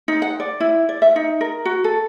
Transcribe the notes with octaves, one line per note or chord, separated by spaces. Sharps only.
D#4
F#5
D5
E4
D5
E5
D#4
A#4
F#4
A4